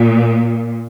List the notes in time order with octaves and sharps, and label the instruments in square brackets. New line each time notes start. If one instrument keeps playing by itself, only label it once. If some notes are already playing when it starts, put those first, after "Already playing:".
Already playing: [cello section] A#2